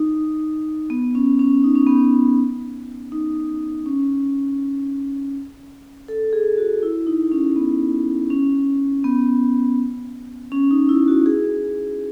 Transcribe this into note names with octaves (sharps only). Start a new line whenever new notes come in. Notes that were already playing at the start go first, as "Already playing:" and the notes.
Already playing: D#4
B3
C#4
C#4
D#4
C#4
B3
C#4
D#4
C#4
A4
G#4
F#4
E4
D#4
C#4
B3
C#4
B3
C#4
D#4
E4
F#4
G#4